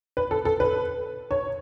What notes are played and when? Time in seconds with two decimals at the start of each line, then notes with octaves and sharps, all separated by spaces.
0.17 B4
0.31 A4
0.45 A4
0.60 B4
1.31 C#5